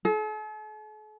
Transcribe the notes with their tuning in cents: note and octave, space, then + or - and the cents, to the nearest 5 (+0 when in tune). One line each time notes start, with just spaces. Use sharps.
A4 -45